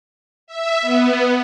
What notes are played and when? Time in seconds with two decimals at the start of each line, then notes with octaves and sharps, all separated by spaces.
0.47 E5
0.82 B3